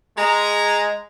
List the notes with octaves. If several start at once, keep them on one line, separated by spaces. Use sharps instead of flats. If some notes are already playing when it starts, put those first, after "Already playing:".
G#3 A#5